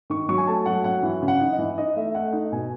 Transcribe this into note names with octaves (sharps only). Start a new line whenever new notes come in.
D#3 C#6
F#3 C#6
G#5
A3 A5
F#3 F#5
F#3 F#5
E3
C#3
F#5
D#4
D#5
E3
D#4 D#5
A3 E5
A3 F#5
D#4
B2 G#5